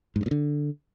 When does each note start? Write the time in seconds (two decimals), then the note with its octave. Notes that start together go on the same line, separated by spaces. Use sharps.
0.16 G#2
0.21 G2
0.26 A#2
0.31 D3